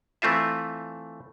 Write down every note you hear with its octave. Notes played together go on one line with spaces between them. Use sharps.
E3 A3 C4 F4 E5